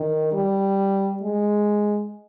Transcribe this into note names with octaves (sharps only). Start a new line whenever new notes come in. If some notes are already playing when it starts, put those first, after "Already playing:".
Already playing: D#3
G3
G#3